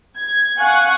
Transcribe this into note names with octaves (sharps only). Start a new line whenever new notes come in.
G#6
F5 F#5 G#5 C#6 F#6